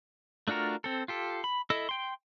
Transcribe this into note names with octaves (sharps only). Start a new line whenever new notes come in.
A3 D4 F4 F#4 A#4
C4 A4
F4 G4 A4
B5
E4 A4 D#5 E5
G5 C6